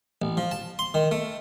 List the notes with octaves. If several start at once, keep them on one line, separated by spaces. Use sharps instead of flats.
A1
F3
A5
C6
D#3
A3